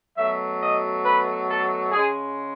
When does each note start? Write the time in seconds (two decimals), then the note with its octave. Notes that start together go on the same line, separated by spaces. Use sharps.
0.17 B2 F#3 A3 E5
0.61 D#5
1.05 B4
1.49 A4
1.91 C#3 G#3 G#4